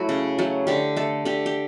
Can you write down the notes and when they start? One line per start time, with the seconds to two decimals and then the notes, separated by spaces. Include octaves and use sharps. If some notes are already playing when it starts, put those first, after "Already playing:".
Already playing: F#3 A3 E4 F#4
0.09 C#3
0.38 F#3 A3
0.67 D3 G4
0.97 A3 A4
1.25 D3 G4
1.46 G4